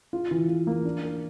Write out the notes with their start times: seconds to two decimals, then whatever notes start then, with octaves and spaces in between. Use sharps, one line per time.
0.13 F4
0.31 E3
0.49 F4
0.67 A#3
0.85 D4
1.03 A#4